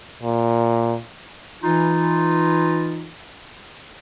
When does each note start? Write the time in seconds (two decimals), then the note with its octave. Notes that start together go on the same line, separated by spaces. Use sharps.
0.23 A#2
1.63 E3 D#4 F4